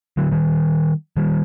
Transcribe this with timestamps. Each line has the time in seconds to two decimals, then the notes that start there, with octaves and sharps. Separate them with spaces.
0.17 D3 F#3
0.31 D#3 G3
1.17 D#3 G3